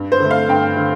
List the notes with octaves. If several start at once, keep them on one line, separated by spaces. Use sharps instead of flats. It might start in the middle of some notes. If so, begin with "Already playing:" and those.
Already playing: G2
C5
D3 A3
F5
G2 G5
D3